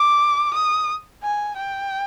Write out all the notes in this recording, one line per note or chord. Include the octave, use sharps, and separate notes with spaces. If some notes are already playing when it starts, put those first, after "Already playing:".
Already playing: D6
D#6
G#5
G5